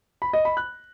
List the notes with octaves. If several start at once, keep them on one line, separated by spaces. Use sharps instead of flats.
B5
D#5
B5
F#6